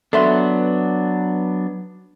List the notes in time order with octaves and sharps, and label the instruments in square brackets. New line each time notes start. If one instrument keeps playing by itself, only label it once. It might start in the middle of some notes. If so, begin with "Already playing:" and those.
[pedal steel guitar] F#3 B3 D4 [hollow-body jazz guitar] A4 E5 C6